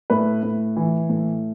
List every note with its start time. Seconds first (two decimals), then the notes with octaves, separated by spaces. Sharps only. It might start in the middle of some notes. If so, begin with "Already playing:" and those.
0.10 A2 B4
0.43 A2
0.76 E3
1.09 A2